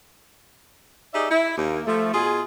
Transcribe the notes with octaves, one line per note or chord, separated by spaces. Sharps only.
D#4 G4 G#4 D5 E5
E4
D#2 A#3
F3 A3
B2 F4 G#4